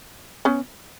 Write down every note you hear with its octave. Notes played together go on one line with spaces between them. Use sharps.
B3 C#4